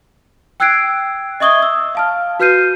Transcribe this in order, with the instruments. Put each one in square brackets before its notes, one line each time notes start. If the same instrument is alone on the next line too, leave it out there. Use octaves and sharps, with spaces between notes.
[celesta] G5 E6 F#6 G#6 C7 D7
D#5 E5 C#6 D#6 G#6 G7
E6
F5 A5 F6
F#4 B4 F6 G6 C7 D#7